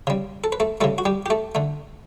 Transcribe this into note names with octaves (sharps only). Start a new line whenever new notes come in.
C#3 G3
A4
B4
A3 A4
C#3 G3 A3 A4
F#4
G3 G4
G4
A3 A4
D3 A3